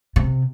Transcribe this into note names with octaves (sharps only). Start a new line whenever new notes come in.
C3